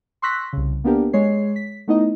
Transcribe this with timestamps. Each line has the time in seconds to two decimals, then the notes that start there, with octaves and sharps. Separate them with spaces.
0.22 C6 C#6 E6 F#6 A#6 B6
0.53 C2 C#3
0.84 A#3 B3 D4 G4 A#4
1.13 G#3 C#5 C7
1.56 B6
1.88 A3 B3 D#4 E4 D#5